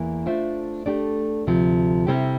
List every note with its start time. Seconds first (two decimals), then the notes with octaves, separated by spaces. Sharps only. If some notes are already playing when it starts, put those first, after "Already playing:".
Already playing: E2 E3 A#3
0.26 A3 D4 F4 C5 E5
0.86 A3 D4 G4 D5
1.47 D2 C3 F3
2.07 C3 G3 C4 E4 G4